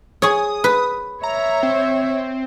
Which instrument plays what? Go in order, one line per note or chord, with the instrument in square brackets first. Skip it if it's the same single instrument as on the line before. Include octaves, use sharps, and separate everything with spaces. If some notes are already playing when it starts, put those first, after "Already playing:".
[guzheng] G#4 C#5 [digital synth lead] D#6
[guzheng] B4
[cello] C#5 E5 [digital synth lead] A#5
[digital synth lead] C4